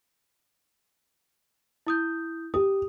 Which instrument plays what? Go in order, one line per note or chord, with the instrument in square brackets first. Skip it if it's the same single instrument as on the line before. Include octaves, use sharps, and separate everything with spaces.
[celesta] E4 D#6 G6
[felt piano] G4 [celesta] D#6